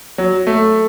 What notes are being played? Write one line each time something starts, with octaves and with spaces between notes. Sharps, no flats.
F#3
A3